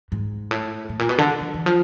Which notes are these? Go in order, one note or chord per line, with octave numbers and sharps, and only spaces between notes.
G#2
A2
A2
A#2
B2
D3
E3
E3
F3